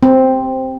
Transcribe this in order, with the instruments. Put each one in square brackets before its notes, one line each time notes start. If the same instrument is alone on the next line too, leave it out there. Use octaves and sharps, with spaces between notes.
[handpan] C4